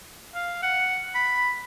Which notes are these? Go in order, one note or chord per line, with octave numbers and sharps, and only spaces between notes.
F5
F#5
B5